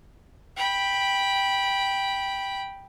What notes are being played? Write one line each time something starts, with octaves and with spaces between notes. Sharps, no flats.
G5 B5